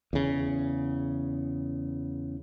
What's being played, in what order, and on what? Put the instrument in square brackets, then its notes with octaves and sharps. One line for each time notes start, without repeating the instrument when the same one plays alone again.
[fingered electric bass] E2 C#3